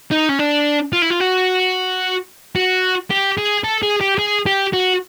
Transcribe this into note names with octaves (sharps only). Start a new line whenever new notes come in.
D#4
C#4
D4
F4
E4
F4
F#4
F#4
G4
G#4
A4
G#4
G4
G#4
G4
F#4